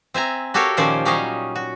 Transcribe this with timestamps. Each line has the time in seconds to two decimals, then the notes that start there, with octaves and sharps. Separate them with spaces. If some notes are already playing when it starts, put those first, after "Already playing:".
0.14 C4 E5 G#5 A#5
0.54 F#4 G4 A4 A#4 C#5 F5
0.77 A#2 D#3 F3 C#4 C5 D5
1.05 F#3 G3 C#4 D#4 D#5 F5
1.56 F#4